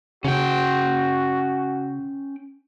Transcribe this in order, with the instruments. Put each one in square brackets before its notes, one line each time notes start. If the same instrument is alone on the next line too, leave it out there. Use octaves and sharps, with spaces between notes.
[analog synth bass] C#3 [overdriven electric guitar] C#4 G5 [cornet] F#4